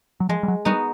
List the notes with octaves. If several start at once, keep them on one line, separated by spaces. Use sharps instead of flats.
F#3
F3 G#3
G3
F#3
G3 B3 D#4 F#4